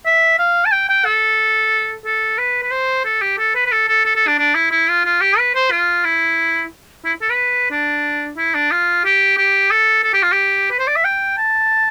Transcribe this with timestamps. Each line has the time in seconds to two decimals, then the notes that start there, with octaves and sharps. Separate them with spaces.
0.06 E5
0.39 F5
0.66 A5
0.72 G5
0.89 G5
1.05 A4
2.06 A4
2.38 B4
2.63 B4
2.71 C5
3.05 A4
3.22 G4
3.38 A4
3.55 B4
3.66 B4
3.72 A4
3.89 A4
4.05 A4
4.16 A4
4.27 D4
4.39 D4
4.55 E4
4.71 E4
4.88 F4
5.05 F4
5.21 G4
5.39 B4
5.55 C5
5.71 F4
6.05 E4
7.05 E4
7.22 A4
7.30 B4
7.71 D4
8.37 E4
8.55 D4
8.72 F4
9.05 G4
9.38 G4
9.71 A4
10.04 A4
10.14 G4
10.23 F4
10.32 G4
10.71 B4
10.79 C5
10.87 D5
10.96 E5
11.05 G5
11.38 A5